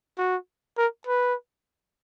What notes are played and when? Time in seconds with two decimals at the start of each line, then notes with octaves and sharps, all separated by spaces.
0.19 F#4
0.78 A#4
1.07 B4